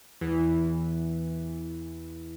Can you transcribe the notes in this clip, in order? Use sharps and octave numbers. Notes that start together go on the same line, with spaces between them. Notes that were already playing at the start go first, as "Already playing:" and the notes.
E2 E3